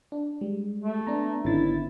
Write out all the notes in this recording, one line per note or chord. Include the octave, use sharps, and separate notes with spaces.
D4
G3 G#3
A3
B3 D4 A#5
G#1 D3 B3 C#4 D#4 E4 A6